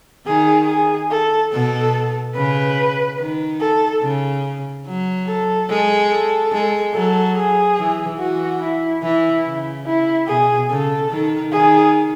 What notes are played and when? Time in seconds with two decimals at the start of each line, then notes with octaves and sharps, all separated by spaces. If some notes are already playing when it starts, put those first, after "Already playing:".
0.26 D#3 G#4
0.68 G#4
1.10 A4
1.52 B2 A4
2.35 C#3 B4
3.18 D#3
3.60 A4
4.02 C#3
4.86 F#3
5.27 A4
5.69 G#3
6.10 A4
6.52 G#3
6.94 F#3 A4
7.36 G#4
7.78 E3
8.19 E3 F#4
8.60 E4
9.02 E3 E4
9.44 C#3
9.86 E4
10.27 B2 G#4
10.69 C#3 A4
11.11 D#3
11.52 D#3 G#4